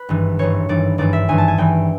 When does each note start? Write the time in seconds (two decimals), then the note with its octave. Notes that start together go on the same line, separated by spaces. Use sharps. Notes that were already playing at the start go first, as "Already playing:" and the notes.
Already playing: B4
0.09 G#1 G2 E3
0.39 G#1 G2 E3 C#5
0.69 G#1 G2 E3 D5
0.98 G#1 G2 E3 D5
1.13 E5
1.28 G#1 G2 E3 G#5
1.38 A5
1.48 G#5
1.58 G#1 G2 E3 G5